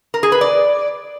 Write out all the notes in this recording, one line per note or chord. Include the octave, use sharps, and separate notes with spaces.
A#4
G#4
B4
D5